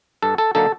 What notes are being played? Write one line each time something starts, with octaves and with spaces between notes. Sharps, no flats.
G2 A4
A4
D3 F#3 A#3 D#4 A4